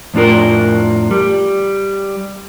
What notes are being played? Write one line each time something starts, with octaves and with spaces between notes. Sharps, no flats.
F2 A2 D4 F4 A#4
G3